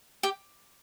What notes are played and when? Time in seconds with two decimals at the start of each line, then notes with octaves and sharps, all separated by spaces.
0.23 G4